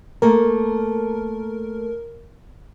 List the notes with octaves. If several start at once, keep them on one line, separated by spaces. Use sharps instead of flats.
A3 A#3 A#4